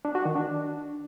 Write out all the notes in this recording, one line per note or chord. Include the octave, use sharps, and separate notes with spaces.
D4
F#4
D#3
D4